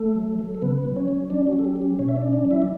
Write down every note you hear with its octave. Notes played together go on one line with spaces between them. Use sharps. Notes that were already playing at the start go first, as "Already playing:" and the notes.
Already playing: A3 A4
F#3
F#3
A4
C#3 B3 B4
F#3
C#4 C#5
F#3
C#4 D4 D5
F#4
F#3
A4
G4
C#4
G4
B2 C#4 C#5
E5
D4 D5
C#4
D4 D5
F#3
E4 E5
D5